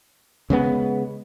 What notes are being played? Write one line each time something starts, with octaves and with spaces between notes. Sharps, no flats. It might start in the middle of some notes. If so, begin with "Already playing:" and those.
C#3 G#3 B3